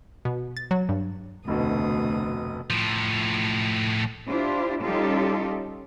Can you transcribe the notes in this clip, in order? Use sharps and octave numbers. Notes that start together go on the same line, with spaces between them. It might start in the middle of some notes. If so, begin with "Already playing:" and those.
B2
A6
F#3
G2
F1 D2 B2 D#6
A2 F3
D4 E4 F4 G4 C5
G3 C#4 D#4 F4 G4 A4